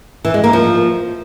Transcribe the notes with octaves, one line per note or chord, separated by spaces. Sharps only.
E3
G#3
A#3
F3